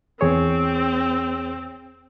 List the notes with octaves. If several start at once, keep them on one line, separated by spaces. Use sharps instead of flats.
E2 C4 G#4 C#5